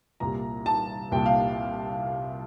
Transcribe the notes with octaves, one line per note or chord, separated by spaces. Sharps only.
C2 A#2 G3 A#5
A5
C2 A#2 G3 G5
F5